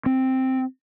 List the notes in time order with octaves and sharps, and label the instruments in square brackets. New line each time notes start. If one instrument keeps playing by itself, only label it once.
[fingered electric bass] C4